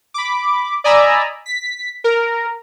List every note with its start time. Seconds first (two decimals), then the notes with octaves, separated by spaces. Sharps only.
0.14 B5 D6
0.84 D5 D#5 G#5 A#5 B5 E6
1.46 B6
2.04 A#4